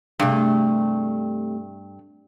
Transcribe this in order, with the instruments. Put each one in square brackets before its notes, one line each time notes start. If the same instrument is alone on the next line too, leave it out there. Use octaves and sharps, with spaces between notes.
[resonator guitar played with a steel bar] G2 [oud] C3 A3 G#4